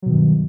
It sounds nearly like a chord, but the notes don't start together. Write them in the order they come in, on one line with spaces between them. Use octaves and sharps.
F#3 B2 D#3 G2